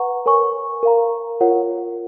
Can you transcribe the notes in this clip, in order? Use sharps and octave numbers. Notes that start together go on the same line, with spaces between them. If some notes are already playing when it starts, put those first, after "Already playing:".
Already playing: B4 F#5 A#5 C#6
A#4 C#5 G#5 C#6
A#4 F5 A#5
F4 A#4 C#5 F#5